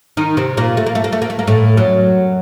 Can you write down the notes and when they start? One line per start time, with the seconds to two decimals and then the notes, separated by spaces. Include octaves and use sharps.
0.17 D#3 D#4
0.37 C3 C4
0.57 A#2 A#3
0.77 A3
0.86 A#3
0.95 A3
1.04 A#3
1.12 A3
1.22 A#3
1.30 A3
1.39 A#3
1.47 A2 A3
1.77 F#2 F#3